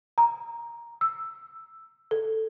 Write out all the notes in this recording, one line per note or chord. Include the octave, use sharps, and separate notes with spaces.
A#5
E6
A4